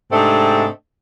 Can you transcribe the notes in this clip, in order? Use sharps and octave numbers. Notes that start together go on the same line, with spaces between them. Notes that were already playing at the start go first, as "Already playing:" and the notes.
G#2 C3 A3 C4 D4 D#5